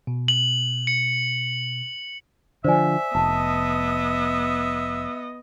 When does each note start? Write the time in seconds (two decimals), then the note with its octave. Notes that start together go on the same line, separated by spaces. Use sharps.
0.07 B2
0.28 F#7
0.87 C#7
2.64 D3 F3 C5 D5 E5 G#5
3.15 F1 B3 D#5 A5